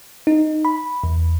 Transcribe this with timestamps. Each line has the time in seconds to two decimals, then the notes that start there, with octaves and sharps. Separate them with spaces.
0.27 D#4
0.65 B5
1.04 E2